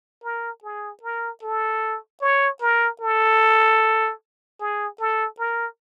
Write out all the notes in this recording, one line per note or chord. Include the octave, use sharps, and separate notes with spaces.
A#4
G#4
A#4
A4
C#5
A#4
A4
G#4
A4
A#4